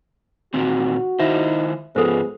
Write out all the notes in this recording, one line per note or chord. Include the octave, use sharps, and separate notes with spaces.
A#2 D#3 C4 F#4
D#3 D#4 E4 C5 E5
G#2 F3 B3 G#4 A4 C5